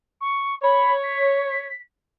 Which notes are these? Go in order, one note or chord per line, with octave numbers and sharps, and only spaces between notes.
C#6
C#5 B5
B6